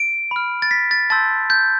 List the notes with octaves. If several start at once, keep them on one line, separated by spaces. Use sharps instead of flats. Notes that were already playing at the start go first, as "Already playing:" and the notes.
Already playing: D7
B5 F6
A6
B6
A6
A5 C6 E6 G6 A6
G6